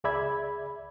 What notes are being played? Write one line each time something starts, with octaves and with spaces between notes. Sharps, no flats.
C#2 G#4 D5 E5 B5 G#6